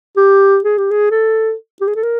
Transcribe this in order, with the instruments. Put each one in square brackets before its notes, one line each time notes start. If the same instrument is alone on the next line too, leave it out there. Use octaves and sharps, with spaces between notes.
[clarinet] G4
G#4
G4
G#4
A4
G4
G#4
A4
A#4